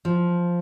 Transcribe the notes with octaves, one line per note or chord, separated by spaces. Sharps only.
F3